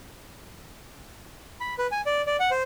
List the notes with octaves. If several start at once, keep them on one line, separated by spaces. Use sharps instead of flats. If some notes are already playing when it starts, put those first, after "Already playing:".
B5
B4
G#5
D5
D5
F#5
C5